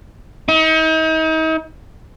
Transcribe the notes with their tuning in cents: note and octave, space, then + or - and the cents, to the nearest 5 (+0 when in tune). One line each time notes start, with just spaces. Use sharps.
D#4 +40